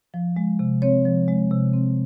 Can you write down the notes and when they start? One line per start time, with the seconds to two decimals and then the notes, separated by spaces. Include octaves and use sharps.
0.14 F3
0.36 G#3
0.59 C3
0.82 C4 C#5
1.05 F3
1.28 G#3
1.51 C3
1.73 C4